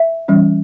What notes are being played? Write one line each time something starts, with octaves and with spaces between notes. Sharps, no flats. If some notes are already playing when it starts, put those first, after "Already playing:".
Already playing: E5
E3 G3 C#4